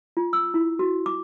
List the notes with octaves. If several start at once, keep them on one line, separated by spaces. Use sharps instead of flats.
F4
E6
E4
F#4
D6